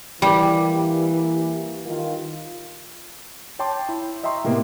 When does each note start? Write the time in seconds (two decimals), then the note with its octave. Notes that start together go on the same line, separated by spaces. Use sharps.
0.22 E3 G3 A#3
1.85 D#3 F4
3.59 C#5 G5 A5 C6 D6
3.89 E4
4.24 D#5 E5 G5 A#5 C6 C#6
4.44 A2 C3 A#3 B3